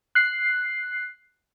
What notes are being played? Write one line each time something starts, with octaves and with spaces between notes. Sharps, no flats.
F#6 C7